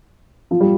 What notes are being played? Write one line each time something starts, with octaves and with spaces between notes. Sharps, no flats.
F3
G3